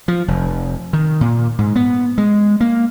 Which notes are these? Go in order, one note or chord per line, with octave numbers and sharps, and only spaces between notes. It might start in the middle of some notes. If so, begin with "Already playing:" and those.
F3
F1
D#3
A#2
G#2
B3
G#3
A#3